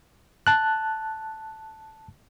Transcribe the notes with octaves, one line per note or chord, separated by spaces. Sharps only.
A5 F#6